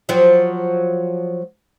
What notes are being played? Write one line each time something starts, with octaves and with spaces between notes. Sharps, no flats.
F3 F#3